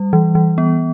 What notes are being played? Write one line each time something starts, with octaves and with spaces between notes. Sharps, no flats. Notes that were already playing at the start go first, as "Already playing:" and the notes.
Already playing: G3
E3
E3
B3